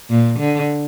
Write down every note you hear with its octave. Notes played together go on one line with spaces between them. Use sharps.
A#2
D3